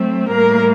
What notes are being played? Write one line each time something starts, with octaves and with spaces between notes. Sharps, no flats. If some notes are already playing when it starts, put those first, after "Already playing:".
Already playing: F#3 A3 C4
A2 G3 A#3 A#4